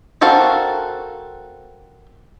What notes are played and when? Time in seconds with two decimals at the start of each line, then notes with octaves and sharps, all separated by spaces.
0.21 C4 F#4 A4 A#4 F5